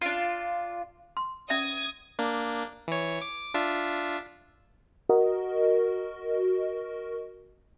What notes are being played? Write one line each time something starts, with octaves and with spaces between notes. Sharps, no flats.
D4 F4
C6
C#4 D5 E5 D#6 G#6
A#3 D4
E3 C#5
D6
D4 F4 E5
F#4 A#4 D#5